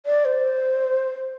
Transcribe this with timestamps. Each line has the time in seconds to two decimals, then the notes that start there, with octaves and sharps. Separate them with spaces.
0.06 D5
0.25 C5